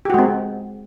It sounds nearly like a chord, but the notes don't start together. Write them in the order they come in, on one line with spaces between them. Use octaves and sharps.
G4 F#4 G#3 C4